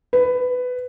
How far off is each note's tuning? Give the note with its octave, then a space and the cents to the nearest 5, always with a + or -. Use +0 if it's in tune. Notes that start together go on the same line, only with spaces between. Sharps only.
B4 +15